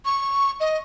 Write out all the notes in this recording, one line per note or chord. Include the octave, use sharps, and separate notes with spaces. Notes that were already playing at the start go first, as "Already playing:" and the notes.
C#6
D#5